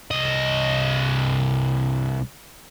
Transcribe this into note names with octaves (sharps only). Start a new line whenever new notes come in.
C2 D#5